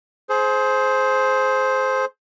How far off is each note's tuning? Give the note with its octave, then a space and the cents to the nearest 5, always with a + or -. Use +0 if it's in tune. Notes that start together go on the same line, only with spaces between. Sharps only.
G#4 +35 C5 +0